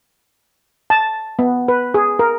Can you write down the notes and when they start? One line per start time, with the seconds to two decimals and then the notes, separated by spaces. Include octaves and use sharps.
0.90 A5
1.39 B3
1.68 B4
1.94 G#4
2.19 A#4